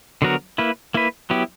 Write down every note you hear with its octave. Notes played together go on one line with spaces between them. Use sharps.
D3 F#3 B3 F#4 A#4
A#3 E4 B4
A#3 E4 B4
F#3 B3 E4 G4